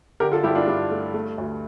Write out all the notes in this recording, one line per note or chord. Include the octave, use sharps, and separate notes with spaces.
D3 G4 A#4
F4 A4
G2 E4 G4
D4 F4
G2 D4
A3
A3
D2